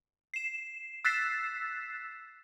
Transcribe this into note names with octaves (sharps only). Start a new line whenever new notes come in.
C7 E7
E6 F#6 A6 B6 C7 E7